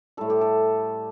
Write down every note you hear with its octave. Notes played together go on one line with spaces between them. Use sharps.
A2 G3 A4
G4
A4